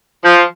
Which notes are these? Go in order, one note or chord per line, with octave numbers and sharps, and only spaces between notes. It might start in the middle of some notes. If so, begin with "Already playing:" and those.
F3